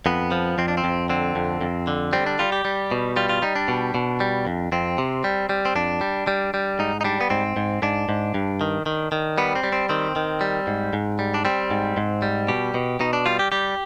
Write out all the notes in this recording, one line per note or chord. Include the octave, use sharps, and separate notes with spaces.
F2 B3
F3
F2 C4
D4
C4
F2
D3 C4
F2
F2
D3
G3 C4
D4
G3 F4
G4
G3
B2
G3 F4
F4
G3 D#4
D4
B2
B2
G3
F2
F2 C4
C3
G3
G3
C4
F2 D4
G3
G3
G3
G#2 D#4
D#4
G3 D4
B3
G#2 C4
G#2
G#2 D4
G#2
G2
D#3
D#3
D#3
G3 B3
C4
G3
C4
D#3 C4
D#3
G3
G#2
G#2
G3
D4
G3 C4
G#2
G#2
G3
B2 G4
B2
B2 D#4
D4
G3 F4
G4
G3 G4